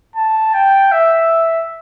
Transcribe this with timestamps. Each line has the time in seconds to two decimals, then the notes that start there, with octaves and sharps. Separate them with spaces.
0.16 A5
0.54 G5
0.92 E5